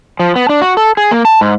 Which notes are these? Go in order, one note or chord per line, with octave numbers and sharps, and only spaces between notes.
F3
B3
D4
F#4
A4
G#4
A#3
A5
G#2